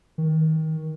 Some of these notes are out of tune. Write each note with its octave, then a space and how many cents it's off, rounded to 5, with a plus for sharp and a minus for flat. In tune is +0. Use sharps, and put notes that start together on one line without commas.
D#3 +25